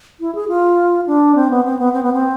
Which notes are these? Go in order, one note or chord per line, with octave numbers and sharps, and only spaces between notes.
E4
G#4
F4
D4
C4
B3
C4
B3
C4
B3
C4